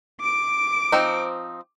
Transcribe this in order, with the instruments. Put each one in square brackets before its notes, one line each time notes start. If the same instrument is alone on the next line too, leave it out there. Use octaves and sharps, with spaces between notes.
[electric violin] D6 D7
[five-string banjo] F3 C4 D#4